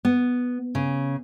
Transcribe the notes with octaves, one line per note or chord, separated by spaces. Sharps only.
B3
C#3